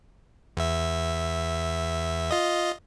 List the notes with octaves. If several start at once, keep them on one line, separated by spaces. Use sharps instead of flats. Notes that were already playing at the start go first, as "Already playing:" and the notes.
E2 E5
F4 D#5